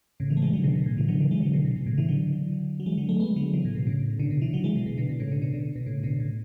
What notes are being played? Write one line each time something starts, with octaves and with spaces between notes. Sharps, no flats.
A2 C#3
C#3 E3
A3
E3 G#3
D3 F#3
B2 D3
B2
A2
C#3 E3
D3 F#3
C#3 E3
E3 G#3
D3 F#3
B2 D3
B2
B2
A2 C#3
C#3 E3
D3 F#3
F#3
E3 G#3
D3 F#3
F#3 A3
G#3 B3
D3 F#3
C#3 E3
A2
B2
A2 C#3
B2 D3
B2 D3
C#3 E3
D3 F#3
E3 G#3
B2
B2
B2 D3
B2
A2 C#3
B2 D3
B2 D3
B2 D3
B2
A2 C#3
B2 D3
A2